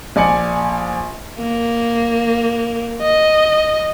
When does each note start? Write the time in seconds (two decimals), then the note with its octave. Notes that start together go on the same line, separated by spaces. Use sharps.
0.16 A#1 D5 G#5 C#7 F#7
1.39 A#3
3.01 D#5